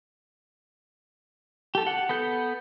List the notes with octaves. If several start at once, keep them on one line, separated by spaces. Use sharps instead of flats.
G4 A4
F#5
B3 A4 G6